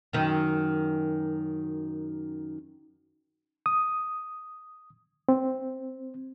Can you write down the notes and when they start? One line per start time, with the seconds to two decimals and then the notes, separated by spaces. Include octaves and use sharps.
0.13 F#2 D#3
3.66 D#6
5.29 C4